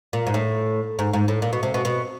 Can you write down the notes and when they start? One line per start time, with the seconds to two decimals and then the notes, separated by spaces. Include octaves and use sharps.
0.13 A#2
0.27 G#2
0.34 A2
0.99 G#2
1.13 G#2
1.28 A2
1.42 A#2
1.53 B2
1.63 C3
1.74 B2
1.85 B2